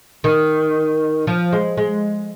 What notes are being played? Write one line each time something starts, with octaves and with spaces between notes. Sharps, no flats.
D#3
F3
G#3
G#3